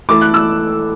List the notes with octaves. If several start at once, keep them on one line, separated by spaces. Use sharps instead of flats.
E3 A3 E4 A4 D6
F#6
E6